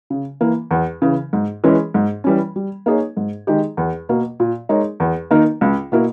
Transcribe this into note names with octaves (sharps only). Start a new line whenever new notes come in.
C#3
E3 A#3
E2
C#3 E3
G#2
E3 G#3 C#4
G#2
E3 G3 C#4
G3
A#3 D#4 G#4 C#5
G#2
D#3 G#3 D#4 G4
E2
B2 A#3
A#2
G#3 D#4 A#4 C#5
E2
D#3 A#3 D#4 A#4
C#2
B2 A#3 E4 A#4